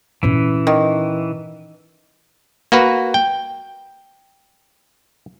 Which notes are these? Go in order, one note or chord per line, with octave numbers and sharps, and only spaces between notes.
A#2 E3 C#4
D#3
A#3 F#4 B4
G5